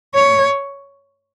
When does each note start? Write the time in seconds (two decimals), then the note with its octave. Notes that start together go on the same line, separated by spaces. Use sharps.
0.14 C#5